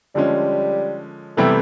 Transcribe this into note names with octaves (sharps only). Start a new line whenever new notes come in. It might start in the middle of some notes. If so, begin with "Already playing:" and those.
D3 F3 G3 G#3 C#4
C3 E3 G3 A3 B3 E4